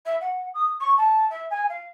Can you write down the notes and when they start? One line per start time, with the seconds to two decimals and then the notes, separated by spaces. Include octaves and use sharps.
0.05 E5
0.21 F#5
0.54 D#6
0.80 C#6
0.97 A5
1.30 E5
1.50 G#5
1.69 F5